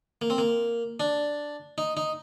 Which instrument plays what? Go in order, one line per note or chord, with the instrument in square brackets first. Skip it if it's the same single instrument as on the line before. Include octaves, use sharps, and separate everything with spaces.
[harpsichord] A#3
C4
A#3
D4
D#4
D#4